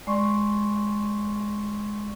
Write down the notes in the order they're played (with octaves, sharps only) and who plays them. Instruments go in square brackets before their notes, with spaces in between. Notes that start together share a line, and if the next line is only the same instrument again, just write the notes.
[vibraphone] G#3 D5 C6 C#6